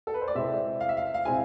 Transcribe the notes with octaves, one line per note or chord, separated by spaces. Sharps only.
A4
B4
C5
D5
C3 G#3 C4 E4 E5
F5
E5
F5
F5
C3 G#3 C4 E4 G#5